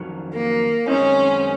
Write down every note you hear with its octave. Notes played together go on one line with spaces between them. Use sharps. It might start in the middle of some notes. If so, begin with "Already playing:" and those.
Already playing: F2 D#3 F#3
A#3
F#2 D#3 G#3 C4 C#4 D#4